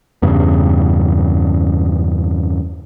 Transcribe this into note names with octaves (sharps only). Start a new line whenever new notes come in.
E2 G2 C#3